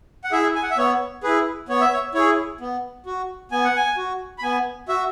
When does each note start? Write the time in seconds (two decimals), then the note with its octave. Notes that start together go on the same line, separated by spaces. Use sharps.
0.24 F#5
0.32 E4 G#4 E5
0.56 G#5
0.63 F#5
0.70 E5
0.77 B3 C#5
1.23 E4 G#4 B4
1.69 B3 C#5
1.81 E5
1.93 C#5
2.14 E4 G#4 C#5
2.61 B3
3.06 F#4
3.52 B3 G#5
3.64 F#5
3.76 G#5
3.97 F#4
4.39 B5
4.43 B3 G#5
4.89 F#4 E5